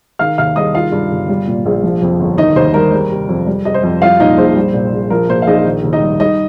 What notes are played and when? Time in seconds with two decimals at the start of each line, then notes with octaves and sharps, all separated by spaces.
0.19 D#3 F5 F6
0.38 D#2 F5 F6
0.56 G3 D#5 D#6
0.74 D#3 F4 F5
0.92 G2
1.11 G1
1.29 G3
1.48 A#2
1.66 A#1
1.83 F3
2.02 F2
2.20 G1
2.38 D#3 D#4 D#5
2.56 D#2 C5
2.74 G3 A#4
2.92 G3
3.11 C3
3.29 F2
3.47 G3
3.65 C3 D#5
3.74 C5
3.83 F2
4.02 G3 F4 F5
4.20 A#2 D#4 D#5
4.38 A#1 C5
4.56 G3
4.74 A#2
4.93 A#1
5.10 F3 A#4
5.30 A#2 C5
5.42 F5
5.47 A#1 D#4 D#5
5.65 D#3
5.84 D#2
5.93 D#4 D#5
6.02 G3
6.20 G3 D#4 D#5